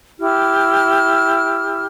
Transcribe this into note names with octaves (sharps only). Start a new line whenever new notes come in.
E4 G4 F6